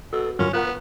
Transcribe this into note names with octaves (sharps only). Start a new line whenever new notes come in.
B2 F#4 A4
G2 D3 F#3 C#4 F4 A#4
B3 F4 A#4 B4 F#5